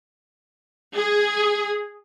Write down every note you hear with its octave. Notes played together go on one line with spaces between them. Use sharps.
G#4